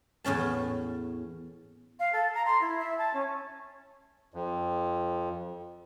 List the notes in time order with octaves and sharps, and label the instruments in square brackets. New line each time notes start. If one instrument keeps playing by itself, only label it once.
[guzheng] E2 A2 C#4 A5
[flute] F5
A4
A#5
C6
E4
E5
A5
C#4
[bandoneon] F2